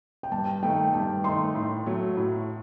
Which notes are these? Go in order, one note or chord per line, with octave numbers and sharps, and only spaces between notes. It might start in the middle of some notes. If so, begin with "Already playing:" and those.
G5
G2 A5
D#3 A3 D#4 G5
G2 A5
D#3 A3 D#4 C6
A2
F#3 A3
A2